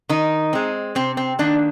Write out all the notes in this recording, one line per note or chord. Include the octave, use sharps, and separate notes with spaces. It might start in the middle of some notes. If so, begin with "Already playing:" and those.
D#3 D#4
G#3 C4
C3 C4
C4
D#3 A#3 D4